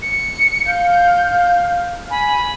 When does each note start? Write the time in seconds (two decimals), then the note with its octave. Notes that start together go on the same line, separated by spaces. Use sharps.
0.02 C#7
0.66 F5 G6
2.10 G#5 B5